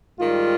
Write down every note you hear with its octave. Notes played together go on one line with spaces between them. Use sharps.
G#2 D#3 G3 F4